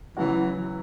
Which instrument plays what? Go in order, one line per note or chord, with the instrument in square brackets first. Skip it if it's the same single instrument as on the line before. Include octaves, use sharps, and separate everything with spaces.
[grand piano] C#3 F#3 C#4 F#4 [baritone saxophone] E3